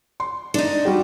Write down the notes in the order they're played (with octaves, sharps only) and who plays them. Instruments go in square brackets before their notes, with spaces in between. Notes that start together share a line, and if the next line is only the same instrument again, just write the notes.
[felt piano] C6
[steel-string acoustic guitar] D4 D#4
[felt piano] G3 F#4 G4